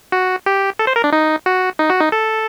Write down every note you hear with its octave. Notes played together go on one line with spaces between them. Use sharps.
F#4
G4
A4
C5
A#4
D4
D#4
F#4
D#4
F#4
D#4
A4